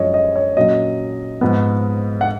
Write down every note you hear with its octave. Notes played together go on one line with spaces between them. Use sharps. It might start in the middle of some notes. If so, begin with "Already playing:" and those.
Already playing: F#2 F3 G#3 C#4 C#5 D#5
D#5
C#5
A#2 F#3 C#4 D#5
G#2 F3 B3
F#5